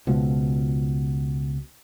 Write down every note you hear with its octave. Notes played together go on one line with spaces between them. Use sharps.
C#2 B2 F3